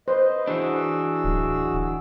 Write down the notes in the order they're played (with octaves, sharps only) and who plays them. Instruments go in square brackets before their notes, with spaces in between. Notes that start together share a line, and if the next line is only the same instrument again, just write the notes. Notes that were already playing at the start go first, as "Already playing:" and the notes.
[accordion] B4 D#5 [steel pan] C5
[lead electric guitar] E3 D4 [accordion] F#4 G#4 E6
[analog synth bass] D1